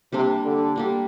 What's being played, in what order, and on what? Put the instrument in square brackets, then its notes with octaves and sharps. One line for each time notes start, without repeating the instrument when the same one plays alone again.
[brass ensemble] C3 [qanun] G3 A#3 D4
[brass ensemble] D3
[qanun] G3 A#3 D4